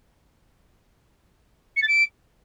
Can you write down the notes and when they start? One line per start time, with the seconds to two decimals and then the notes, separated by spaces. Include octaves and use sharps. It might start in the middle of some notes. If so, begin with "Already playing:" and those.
1.76 C#7
1.82 A6
1.88 D7